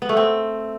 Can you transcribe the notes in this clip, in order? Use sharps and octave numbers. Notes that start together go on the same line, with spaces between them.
B3
A3
C4